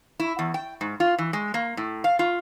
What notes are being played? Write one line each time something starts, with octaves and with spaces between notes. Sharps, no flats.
E4
E2
G5
G#2
F4
E3
G#3
A#3
A2
F5
F4